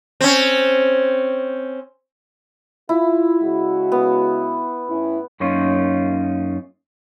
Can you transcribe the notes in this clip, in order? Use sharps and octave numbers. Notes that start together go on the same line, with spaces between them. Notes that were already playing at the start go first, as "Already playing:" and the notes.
C4 C#4
E4 F4
C#3 G#3 F#4
B3
A2 C#4 E4
F#2 A#3 C#4 D#4 F4